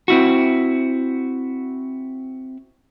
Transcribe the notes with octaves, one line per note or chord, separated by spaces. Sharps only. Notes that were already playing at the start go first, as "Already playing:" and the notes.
C4 E4 F#4